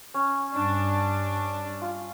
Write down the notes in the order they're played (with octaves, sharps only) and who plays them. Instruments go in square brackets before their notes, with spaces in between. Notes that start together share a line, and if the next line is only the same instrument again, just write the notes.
[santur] C#4
[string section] G2 D4
[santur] F4